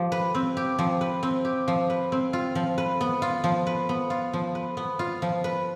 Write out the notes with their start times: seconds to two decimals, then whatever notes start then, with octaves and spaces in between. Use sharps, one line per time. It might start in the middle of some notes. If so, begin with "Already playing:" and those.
Already playing: F3 G4
0.12 B4
0.35 C4
0.57 G4
0.79 F3
1.01 B4
1.23 C4
1.45 G4
1.68 F3
1.90 B4
2.12 C4
2.33 F4
2.55 F3
2.78 B4
3.01 B3
3.22 F4
3.44 F3
3.67 B4
3.89 B3
4.10 F4
4.33 F3
4.55 B4
4.77 B3
4.99 F4
5.22 F3
5.44 B4